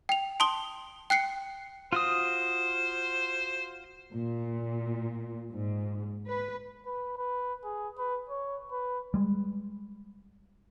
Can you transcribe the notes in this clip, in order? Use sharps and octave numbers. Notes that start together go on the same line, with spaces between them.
G5 F7
A5 C6 D#6 G7
G5 F#6 C7 C#7
F4 F#4 C5 D#6
A#2
G#2
B4
B4
B4
G#4
B4
C#5
B4
G3 G#3